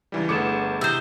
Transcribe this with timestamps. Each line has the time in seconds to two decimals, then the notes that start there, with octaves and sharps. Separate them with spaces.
0.12 C#2 E3 G3
0.29 G1 A3 G#4 B4 F#5 D6 C#7 E7
0.81 C3 E4 C5 D#6 E6 G6